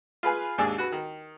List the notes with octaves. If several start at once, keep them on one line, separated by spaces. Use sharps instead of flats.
F4 G#4 B4 F5 G#5
D#2 G#2 D4 G#4 G#5 E6
F#4 B4
D#3